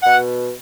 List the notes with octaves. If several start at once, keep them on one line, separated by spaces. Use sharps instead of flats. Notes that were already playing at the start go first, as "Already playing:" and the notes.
B2 F#5